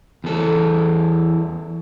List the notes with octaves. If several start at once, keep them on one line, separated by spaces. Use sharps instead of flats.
E2 A4